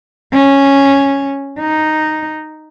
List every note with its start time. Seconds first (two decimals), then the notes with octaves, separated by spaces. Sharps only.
0.33 C#4
1.59 D#4